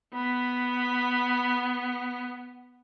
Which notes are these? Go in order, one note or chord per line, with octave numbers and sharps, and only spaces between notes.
B3 B5